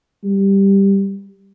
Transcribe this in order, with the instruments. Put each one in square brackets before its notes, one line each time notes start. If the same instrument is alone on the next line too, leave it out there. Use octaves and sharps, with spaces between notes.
[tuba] G3